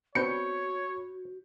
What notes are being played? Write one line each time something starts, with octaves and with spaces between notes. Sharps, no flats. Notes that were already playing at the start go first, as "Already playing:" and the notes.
B3 C4 D4 F#4 C#5 B5 G6 C#7